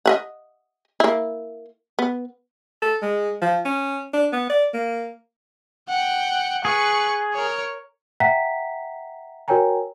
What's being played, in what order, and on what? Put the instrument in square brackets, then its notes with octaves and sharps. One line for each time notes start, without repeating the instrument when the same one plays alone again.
[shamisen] D#5 E5 F#5
A#3 E4
B3
[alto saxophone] A4
G#3
F3
C#4
D4
B3
D5
A#3
[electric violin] F#5 G5
[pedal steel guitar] G#4 [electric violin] B4 C#6
[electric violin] A#4 C#5
[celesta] E5 F#5 G5 A#5 B6
F#4 A#4 C#5 G5 G#5 A#5